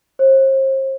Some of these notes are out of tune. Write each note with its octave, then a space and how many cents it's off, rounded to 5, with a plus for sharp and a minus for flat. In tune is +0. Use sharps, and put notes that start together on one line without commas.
C5 +40